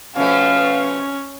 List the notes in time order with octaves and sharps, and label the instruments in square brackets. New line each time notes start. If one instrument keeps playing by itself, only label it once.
[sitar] B2 F3 A3 [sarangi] C#4 [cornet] F5